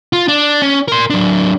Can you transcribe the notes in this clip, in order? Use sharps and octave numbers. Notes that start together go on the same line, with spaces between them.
F4
D4
C#4
A#4 C6
F#3 D4